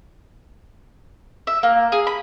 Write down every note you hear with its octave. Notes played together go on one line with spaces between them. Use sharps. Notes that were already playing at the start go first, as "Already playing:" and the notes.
E5
A#3
G#4
B5